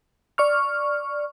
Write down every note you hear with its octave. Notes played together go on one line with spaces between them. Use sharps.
D5 C#6 F6